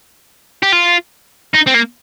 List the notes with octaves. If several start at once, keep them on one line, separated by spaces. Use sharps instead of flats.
G4
F4
D#4
C4
A#3